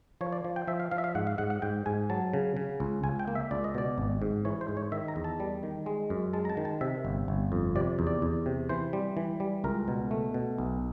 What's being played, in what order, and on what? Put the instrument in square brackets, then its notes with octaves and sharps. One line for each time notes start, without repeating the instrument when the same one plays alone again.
[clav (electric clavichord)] F3 C#5
D5
F3
G5
F3 E5
F5
F3 F5
E5
F5
G#2 F#5
F5
G#2 F#5
F#5
G#2 G5
G#2 G#5
F#3 A5
C#3
C#3
C#2
C#2 G#5
G5
A#3
E5
C#2 D5
D#5
B2 D5
G#1
G#2
E3 C#5
C5
G#2
C#5
D#3 E5
A#5
E2
A5
G3
D#3
G#3
F#2
G#3 A5
A#5
A5
D#3
A5
C3 E5
G1
G1
F2
C3 D5
E2
D5
E2
C3
E3 C5
G3
E3
G3
C#2 A#4
B2
A3
B2
B1